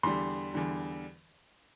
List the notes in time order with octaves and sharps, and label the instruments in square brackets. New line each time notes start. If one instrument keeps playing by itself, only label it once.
[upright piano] E2 D3 G3 C6
E2 D3 G3